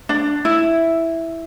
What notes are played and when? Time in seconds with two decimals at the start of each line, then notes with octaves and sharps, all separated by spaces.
0.09 D4
0.45 E4